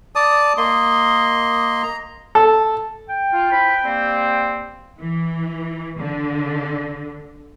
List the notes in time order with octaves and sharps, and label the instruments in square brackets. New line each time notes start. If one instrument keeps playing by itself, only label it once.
[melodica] D5 A5 D#6
A#3 D#5 C6
A#5
[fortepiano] A4
[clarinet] G5
[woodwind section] F4
C4 E4 B4
G3 A#3 C4
[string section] E3
D3